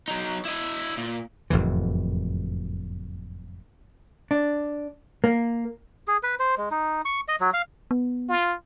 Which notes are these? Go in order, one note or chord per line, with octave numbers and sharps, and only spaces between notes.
F#3 D#4
E4 D#5
A#2
F#1 F2 A2 E3
D4
A#3
G#4
B4
C5
G#3
D#4
C#6
D#5
F#3
F5
B3
F4